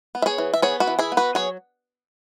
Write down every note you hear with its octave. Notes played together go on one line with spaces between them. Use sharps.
B3
E5
G#4 C#5
E3
E5
B3 G#4 C#5
F#4 B4
E3
E4 G#4
B3
F#4 B4
F#3 G#4 C#5